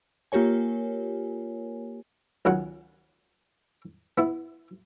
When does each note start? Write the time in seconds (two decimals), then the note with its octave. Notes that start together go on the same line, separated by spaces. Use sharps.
0.32 A#3 F4 G4 A#4 C#5 G#5
2.45 C#2 D#3 F#3 F#5
4.18 B3 E4